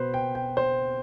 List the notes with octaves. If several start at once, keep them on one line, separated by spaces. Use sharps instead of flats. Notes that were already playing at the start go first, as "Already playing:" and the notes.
Already playing: B2 B3 B4 C5
G5
G5
C5